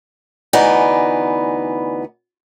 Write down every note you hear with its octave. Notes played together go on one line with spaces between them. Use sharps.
D2 E3 B3 D#4 D5 G#5